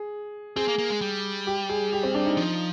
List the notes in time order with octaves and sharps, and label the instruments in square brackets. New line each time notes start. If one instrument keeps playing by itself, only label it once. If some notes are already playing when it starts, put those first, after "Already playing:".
Already playing: [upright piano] G#4
[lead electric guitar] C4 [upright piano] G#4
[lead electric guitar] A#3
A#3
G#3
G3
[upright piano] G4
G#4
G4
C4
D4
D#4
[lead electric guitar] F3